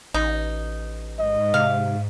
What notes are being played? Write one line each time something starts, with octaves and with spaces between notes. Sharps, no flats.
A1 D#4
G#2 D#5
C3 F5